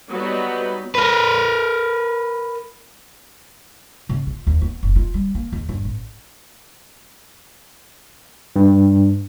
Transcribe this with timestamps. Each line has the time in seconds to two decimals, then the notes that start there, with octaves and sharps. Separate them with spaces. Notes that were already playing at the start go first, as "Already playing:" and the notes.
0.12 F#3 G3 B3 D#4 B4
0.95 A#4 B4
4.09 C#3
4.26 F4
4.47 D#2
4.62 B3
4.83 F#1
4.96 F4
5.14 G3
5.35 A#3
5.53 E2
5.69 G1
5.84 A1
8.56 G2